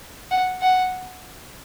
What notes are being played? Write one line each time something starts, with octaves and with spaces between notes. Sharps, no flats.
F#5
F#5